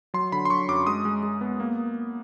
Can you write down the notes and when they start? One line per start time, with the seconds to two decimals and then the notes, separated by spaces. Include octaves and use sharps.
0.14 F#3 C6
0.32 D3 B5
0.45 C6
0.50 F#3 C#6
0.69 F#2 D6
0.87 G#3 D#6
1.05 G#3
1.23 G#3
1.41 B3
1.60 A#3